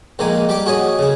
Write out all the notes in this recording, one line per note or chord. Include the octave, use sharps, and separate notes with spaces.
A#1 A#2 D#3 G#3 A#3 G#5
G3 G4 G5 D6
F#4 G#4 C#5 D#5 D#6
C#3 G#4